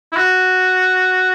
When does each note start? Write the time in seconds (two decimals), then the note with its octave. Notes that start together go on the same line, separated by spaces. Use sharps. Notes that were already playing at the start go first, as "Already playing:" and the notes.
0.12 E4
0.17 F#4